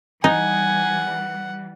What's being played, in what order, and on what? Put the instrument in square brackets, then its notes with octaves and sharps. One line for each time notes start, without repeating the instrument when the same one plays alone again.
[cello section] E3 G3 [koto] D#4 [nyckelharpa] F#5 [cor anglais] G#5